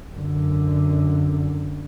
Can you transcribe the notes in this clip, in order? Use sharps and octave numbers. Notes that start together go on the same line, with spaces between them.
F#2 D3